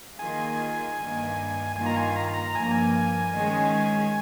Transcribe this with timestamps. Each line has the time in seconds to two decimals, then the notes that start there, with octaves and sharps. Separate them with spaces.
0.18 D#3 A#3 F4 G#4 G#5
0.98 G2 D#3 A#3
1.76 G2 D#3 A#3 F4 G#5
1.86 A#5
1.96 G#5
2.16 A#5
2.34 A#5
2.55 G2 F3 A#3 G#5
2.64 A#5
2.71 G#5
3.33 D#3 G#3 C#4 G#4